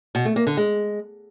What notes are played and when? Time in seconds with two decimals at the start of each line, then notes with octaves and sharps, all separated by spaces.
0.15 B2
0.25 A3
0.36 A#3
0.47 D3
0.57 G#3